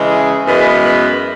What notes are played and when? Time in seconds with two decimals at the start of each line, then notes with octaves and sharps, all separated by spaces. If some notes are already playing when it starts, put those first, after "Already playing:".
Already playing: C#3 E3 G#3
0.09 G#4
0.46 F#2 E3 G#3 B3
0.85 B4